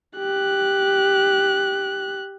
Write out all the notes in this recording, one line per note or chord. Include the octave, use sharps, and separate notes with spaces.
G4 F#6